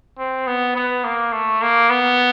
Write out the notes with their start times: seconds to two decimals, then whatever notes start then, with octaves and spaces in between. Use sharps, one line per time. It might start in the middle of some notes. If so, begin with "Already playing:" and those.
0.19 C4
0.47 B3
0.76 B3
1.04 A#3
1.33 A3
1.62 A#3
1.90 B3